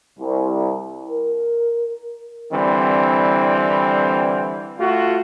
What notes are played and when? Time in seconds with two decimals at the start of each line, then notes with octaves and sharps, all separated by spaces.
0.20 C2
1.10 A#4
2.53 D3 E3 G3 C4
4.79 A3 F4 F#4